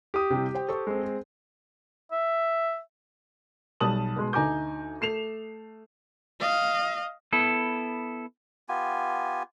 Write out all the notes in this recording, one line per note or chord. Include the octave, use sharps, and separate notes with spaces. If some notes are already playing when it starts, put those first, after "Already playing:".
G4 D#6
C3 G3 E4
C5 G5
A4 C5 C#6
G#3 C4
G#4
E5
B1 G3 A5 D#6 F#7
B2 G#3 C6
D2 D#4 G#5 A#5 D6 G6
A3 C7 E7 F7
D#5 F5
B3 E4 A4
B3 F4 G4 G#5